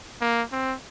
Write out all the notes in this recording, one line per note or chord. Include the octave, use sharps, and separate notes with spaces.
A#3
C4